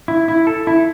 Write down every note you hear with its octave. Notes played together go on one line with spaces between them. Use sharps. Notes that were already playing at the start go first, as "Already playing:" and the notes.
E4
E4
A4
E4